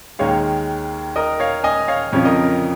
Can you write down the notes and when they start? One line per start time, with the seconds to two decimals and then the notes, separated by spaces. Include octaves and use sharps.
0.19 D#2 D#3 G#3 C#5 F5
1.16 A#4 D#5
1.40 C#5 F5
1.64 D#5 G#5
1.88 C#5 F5
2.12 F2 C#3 F3 C#5
2.25 A#4 D#5